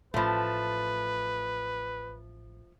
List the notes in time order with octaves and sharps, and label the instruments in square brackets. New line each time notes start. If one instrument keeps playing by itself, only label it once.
[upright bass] A1 [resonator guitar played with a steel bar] F3 A3 [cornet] B4